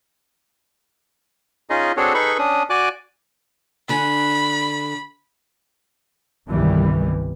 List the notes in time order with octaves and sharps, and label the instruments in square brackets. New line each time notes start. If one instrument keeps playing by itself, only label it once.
[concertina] C#4 D#4 F4 G#4 D#5
C4 D4 F#4 G#4 A4 C#5
D#4 G#4 A4 B4 B5 C#6
C#4 D4 D#6
F#4 D5 G#5 D6 F#6
[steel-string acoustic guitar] D3 D4 G#5 [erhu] B5
[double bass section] G1 C2 D#3 E3 G3